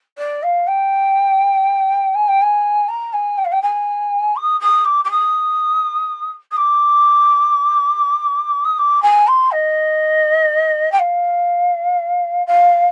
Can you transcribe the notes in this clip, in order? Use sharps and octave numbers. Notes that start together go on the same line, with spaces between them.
D5
F5
G5
G#5
G5
G#5
A#5
G#5
G5
F5
G5
G#5
D#6
D#6
D6
D6
D#6
D#6
D6
D#6
D6
G#5
C6
D#5
G5
F5
F5